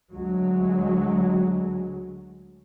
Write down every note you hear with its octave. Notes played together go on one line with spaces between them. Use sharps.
D2 F#3 G#3